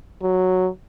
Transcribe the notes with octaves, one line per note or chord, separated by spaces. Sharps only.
F#3